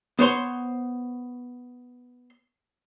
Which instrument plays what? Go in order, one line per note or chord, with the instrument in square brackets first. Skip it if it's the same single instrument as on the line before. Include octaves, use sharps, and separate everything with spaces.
[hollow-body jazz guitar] B3 C5 C#5 C6